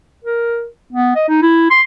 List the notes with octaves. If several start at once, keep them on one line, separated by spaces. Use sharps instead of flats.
A#4
B3
D#5
D#4
E4
C6